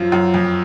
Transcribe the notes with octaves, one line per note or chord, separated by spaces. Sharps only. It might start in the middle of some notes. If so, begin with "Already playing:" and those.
Already playing: F#2 F3
F#2
F2